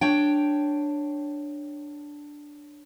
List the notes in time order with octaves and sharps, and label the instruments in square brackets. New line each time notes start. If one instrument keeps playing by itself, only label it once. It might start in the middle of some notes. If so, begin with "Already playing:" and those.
[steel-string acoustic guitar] D4 C#5 G5